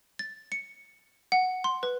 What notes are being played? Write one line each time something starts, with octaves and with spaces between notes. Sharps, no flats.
A6
C#7
F#5
C6
B4